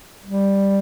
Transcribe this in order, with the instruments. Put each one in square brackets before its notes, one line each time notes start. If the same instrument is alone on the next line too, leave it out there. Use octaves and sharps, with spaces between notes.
[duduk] G3